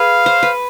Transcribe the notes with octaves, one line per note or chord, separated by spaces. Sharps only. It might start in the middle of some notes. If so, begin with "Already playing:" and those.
Already playing: G#4 B4 F5
C5
B4